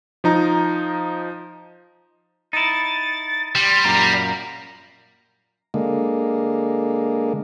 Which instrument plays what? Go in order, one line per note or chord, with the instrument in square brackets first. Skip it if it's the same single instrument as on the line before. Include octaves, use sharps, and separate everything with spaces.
[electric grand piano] F3 D#4 A#5
[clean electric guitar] D#4 E4 [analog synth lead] A6
[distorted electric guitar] G3 [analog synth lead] C6
[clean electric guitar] F#2 A#2 A#3 [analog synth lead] A#5
[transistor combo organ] D3 G#3 A#3